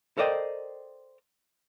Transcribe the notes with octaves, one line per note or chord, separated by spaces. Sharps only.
A4 A#4 C5 D5 D#5 G5